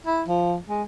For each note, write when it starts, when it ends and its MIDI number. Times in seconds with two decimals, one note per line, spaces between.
0.07 0.22 64
0.28 0.56 53
0.69 0.83 56